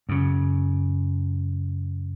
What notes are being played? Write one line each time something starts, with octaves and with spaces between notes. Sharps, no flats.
F#2 C#3